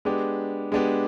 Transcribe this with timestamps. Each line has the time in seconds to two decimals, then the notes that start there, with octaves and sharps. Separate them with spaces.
0.05 G#3 B3 D4 G4
0.72 G#3 B3 D4 G4